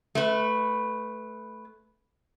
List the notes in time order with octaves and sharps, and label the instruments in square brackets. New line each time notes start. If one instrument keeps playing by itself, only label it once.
[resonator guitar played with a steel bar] A3 B4